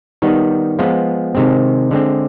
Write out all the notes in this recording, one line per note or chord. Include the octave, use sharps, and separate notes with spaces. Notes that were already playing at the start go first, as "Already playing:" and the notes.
D#3 G3 B3 D#4
F3 G#3 B3 F4
C3 D#3 G#3 C4
D3 G#3 C4